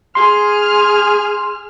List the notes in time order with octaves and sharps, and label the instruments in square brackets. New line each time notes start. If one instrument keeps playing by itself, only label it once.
[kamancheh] G#4 F6 [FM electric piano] C6